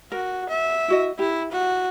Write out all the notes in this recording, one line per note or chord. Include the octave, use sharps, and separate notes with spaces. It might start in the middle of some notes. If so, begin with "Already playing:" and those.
F#4 A#4
E5
E4 F#4 D#5
E4 G4
F#4